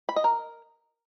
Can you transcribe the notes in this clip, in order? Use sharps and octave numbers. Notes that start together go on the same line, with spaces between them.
B5
D#5
A#4